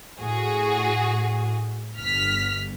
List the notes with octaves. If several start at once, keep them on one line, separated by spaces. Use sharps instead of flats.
A2 F#4 G#4
G1 F6 B6